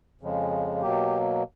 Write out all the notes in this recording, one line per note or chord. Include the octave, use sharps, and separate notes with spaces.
F2 C#3 F3 G#3
B2 F#3 A#3 G4